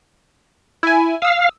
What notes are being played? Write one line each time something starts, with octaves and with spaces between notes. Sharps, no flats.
E4 G#5
F5 D#6 E6